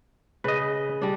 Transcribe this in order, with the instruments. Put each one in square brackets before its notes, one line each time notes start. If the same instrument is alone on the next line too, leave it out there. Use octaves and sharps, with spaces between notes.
[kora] C#3 [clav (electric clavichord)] B4 D#5
[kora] G3 D4